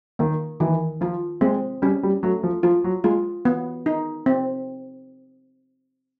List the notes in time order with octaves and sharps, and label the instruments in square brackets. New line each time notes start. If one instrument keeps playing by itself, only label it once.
[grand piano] D#3 [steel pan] A#3
[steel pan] D#3 [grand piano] E3
[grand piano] F3 [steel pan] F4
[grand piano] G#3 [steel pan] C4
[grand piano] G3 [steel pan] C#4
[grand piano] G3
[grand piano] F#3 [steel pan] A3
[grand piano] F3
[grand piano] F3 [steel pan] F4
[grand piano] F#3
[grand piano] G#3 [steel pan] F4
[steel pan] B3
D#4
C4